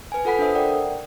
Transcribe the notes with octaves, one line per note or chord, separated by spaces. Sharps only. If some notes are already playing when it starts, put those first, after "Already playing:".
B4 G#5
F4 A4 F#5 B5 B6
D4 A4 C5 E5 D#6
A#4 D5 F#5 G5